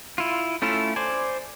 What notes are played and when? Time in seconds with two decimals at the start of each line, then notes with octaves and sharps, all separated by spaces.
0.18 E4 F4
0.62 A3 C#4 E4 F4 A4
0.96 C5 D5 G#5